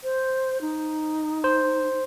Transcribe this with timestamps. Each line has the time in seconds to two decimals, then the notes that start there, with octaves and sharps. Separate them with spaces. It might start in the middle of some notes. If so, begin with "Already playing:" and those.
0.03 C5
0.61 D#4
1.44 C5